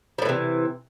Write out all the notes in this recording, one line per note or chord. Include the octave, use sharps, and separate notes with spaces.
A2 C3 E3 F3